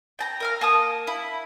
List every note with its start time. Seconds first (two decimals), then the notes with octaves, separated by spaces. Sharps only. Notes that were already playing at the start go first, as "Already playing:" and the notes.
0.19 G5 A5 A#5
0.40 A#4 F5 F6
0.61 A#3 A5 D#6
1.07 E4